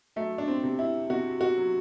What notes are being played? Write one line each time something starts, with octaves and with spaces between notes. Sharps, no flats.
F#3 A3
D4
C4
C3
E4
C3 F#4
F#4
F#3